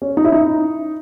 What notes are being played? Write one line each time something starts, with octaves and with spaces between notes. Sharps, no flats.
C#4
D#4
E4
D#4